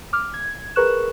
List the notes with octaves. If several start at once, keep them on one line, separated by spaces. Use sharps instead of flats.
D6 F6
G#6
G#4 A#4 B4 C#6 F#6 E7